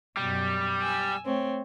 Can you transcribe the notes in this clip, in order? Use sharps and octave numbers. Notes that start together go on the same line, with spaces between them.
F#2 B2 G3
G#5 E6
A3 C4 C#5